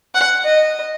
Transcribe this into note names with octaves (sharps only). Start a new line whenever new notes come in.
F#5
D#5